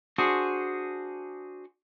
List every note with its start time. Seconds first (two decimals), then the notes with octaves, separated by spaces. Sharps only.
0.18 D4 F#4 G#4 C5